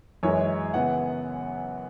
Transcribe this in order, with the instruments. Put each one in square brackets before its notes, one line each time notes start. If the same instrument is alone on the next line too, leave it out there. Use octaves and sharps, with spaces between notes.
[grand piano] F#2 E3 G#3 C#5
C#3 E3 B3 F#5